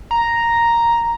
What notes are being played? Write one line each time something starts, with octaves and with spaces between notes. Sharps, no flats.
A#5